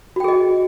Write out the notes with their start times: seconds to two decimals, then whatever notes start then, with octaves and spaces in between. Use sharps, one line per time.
0.16 F#4
0.20 G5
0.24 G#4
0.28 D#5